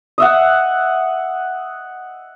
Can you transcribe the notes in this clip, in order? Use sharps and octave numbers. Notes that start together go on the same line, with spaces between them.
D#5 E5 F#5